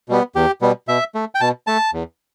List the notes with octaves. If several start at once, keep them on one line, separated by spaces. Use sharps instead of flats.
B2 G3 B3
E2 G4
B2 G3 B3
B2 E5
A3
G5
B2 A5
A3 A5
E2